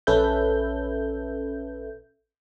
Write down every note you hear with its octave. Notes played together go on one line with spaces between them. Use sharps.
A#1 C#4 A4 B4 E5 G6